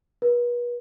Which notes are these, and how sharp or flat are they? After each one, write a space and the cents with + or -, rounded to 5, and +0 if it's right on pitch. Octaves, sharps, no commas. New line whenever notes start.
B4 -40